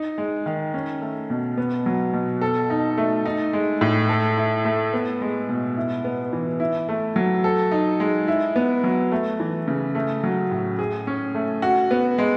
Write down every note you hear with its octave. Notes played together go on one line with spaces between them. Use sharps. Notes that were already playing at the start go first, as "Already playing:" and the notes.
Already playing: D#4
G#3
D#3
C#4
A3
B2
B3
F#3
B2
A4
D#4
A3
D#4
G#3
A2
A4
E4
A3
B3
G#3
B2
E4
B3
E3
E4
A3
F#3
A4
D#4
G#3
E4
B3
F#3
A3
E3
C#3
A3
F#3
A2
G#4
C#4
A3
F#4
B3
G#3